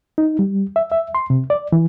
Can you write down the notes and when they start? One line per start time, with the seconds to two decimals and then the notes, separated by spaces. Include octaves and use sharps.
0.18 D#4
0.39 G3
0.76 E5
0.92 E5
1.15 C6
1.30 C3
1.50 D5
1.72 E3